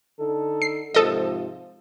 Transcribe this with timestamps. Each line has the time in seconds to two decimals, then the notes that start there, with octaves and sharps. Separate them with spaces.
0.19 D3 D#4 A4
0.62 C7
0.94 G#2 C3 F3 A4 D#5